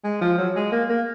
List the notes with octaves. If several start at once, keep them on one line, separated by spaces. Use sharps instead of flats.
G#3
F3
F#3
G#3
A#3
A#3